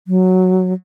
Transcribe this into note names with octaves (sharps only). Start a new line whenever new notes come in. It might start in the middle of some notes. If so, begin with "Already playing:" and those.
F#3